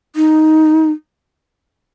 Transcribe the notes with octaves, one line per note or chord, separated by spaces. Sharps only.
D#4